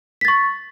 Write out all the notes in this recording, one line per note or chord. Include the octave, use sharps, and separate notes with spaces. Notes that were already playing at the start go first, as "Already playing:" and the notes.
C#6 A6 B6